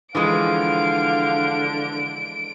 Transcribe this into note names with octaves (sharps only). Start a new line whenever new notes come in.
D3 E3 F3 G#3 F5 D7